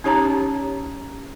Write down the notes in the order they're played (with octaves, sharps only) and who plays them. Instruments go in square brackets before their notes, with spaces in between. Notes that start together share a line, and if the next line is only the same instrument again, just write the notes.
[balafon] C#4 D#4 G4 C#5 A5 A#5